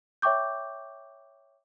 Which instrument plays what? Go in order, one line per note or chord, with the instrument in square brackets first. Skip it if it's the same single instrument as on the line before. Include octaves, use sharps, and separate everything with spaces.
[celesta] C#5 E5 G5 C#6 D6 G6